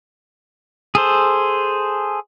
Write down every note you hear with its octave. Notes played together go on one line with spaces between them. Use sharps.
G#4 A4 C5